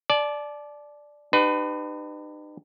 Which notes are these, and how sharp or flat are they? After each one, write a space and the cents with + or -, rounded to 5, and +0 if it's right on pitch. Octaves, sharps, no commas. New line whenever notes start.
D5 +0 A5 -30
D#4 -45 G4 +0 B4 +25